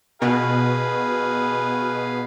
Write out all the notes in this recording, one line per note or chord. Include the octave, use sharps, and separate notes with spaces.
B2 G#4 B4 F5